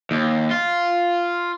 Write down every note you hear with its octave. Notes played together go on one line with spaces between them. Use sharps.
D#2
F4